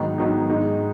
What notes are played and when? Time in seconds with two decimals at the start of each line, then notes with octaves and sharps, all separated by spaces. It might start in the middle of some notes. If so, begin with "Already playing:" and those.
Already playing: G#2 D#3 F#3 B3 D#4
0.18 G#2 D#3 F#3 B3 D#4
0.49 G#2 G#3 D#4